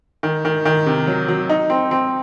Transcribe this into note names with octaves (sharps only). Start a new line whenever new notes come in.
D#3
D#3
D#3
C3
F#3
F#3
D#4
C4
C4